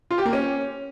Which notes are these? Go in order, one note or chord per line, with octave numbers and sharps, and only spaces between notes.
F4
G4
A#3
C#4